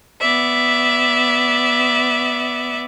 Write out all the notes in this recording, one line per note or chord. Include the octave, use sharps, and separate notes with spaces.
B3 D5 E5